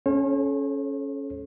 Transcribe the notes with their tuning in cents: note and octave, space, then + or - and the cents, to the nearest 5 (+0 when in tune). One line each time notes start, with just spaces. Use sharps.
C#4 +0 A4 -35 C#5 -45